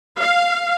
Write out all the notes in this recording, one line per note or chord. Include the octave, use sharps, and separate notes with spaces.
F5